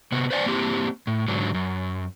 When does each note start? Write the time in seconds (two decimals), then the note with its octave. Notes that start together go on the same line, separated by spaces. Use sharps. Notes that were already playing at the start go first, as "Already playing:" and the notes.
0.12 C3 B3
0.30 B4 C5 D5 E5 G#5
0.46 A#3 C4 E4 G4
1.07 A2
1.28 G#2 D3 F#3
1.54 F#2